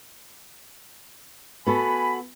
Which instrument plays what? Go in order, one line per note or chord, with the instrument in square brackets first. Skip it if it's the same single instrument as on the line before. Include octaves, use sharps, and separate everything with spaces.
[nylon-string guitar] B3 F#4 A4 [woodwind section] G#5 B5